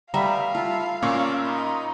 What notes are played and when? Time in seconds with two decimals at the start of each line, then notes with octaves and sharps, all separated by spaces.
0.14 G3 A3 B3 E5 F5 A#5 B5
0.55 F4 A4 E5
1.02 A#2 C#4 A#4 D5 C#6 D6 E6
1.44 D#4 F4 B5